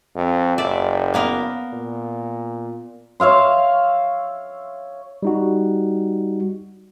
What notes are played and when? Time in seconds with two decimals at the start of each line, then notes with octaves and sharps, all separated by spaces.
0.15 F2
0.58 F#1 D5 E5
1.14 A#3 B3 A#4
1.73 A#2
3.20 C#5 E5 F5 C6
5.23 G3 D#4 F#4